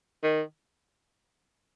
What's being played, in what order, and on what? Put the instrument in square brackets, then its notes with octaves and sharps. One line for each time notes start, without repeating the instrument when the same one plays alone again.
[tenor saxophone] D#3